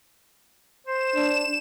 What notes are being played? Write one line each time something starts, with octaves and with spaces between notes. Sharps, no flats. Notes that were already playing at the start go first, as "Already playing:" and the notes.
C5 E7
D4